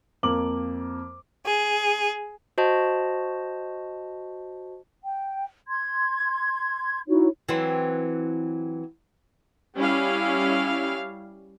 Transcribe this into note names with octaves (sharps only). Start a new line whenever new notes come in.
F2 A#3 D6 F#7
G#4
F#4 C5 D#5 A5
G5
C6 G#6
D#4 E4 F#4 C#5
E3 F#3 C4
G3 C#4 E4 F5